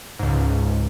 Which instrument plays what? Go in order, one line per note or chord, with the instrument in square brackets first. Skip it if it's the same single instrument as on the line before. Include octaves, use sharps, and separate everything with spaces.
[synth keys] C#2 G#2